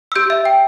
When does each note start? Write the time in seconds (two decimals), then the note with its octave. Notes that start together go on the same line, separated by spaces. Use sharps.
0.12 E6
0.16 G4 G6
0.30 E5
0.45 G5